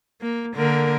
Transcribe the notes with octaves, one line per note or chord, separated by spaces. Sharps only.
A#3
D3 A#3 A#4